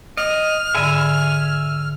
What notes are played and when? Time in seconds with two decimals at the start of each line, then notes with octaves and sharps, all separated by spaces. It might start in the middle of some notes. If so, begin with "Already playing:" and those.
0.17 D#5 F6
0.75 G#2 D3 E5 G#5 B5